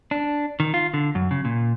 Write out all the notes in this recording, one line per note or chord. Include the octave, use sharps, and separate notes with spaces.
D4
D#3
F4
D3
F#2
C#3
A#2